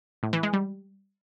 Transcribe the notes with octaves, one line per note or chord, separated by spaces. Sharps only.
A2
E3
G#3
G3